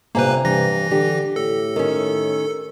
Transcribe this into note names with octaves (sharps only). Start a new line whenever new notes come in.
G1 C3 A#3 B4 G#5 A#5
G2 E3 A#6
D3 G4
A2 A4
D#3 C#4